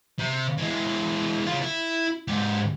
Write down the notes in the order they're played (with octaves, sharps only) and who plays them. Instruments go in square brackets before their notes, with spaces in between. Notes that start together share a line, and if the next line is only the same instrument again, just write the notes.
[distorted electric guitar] C3
E3 G#3
C#3 F4
E4
G#2 G4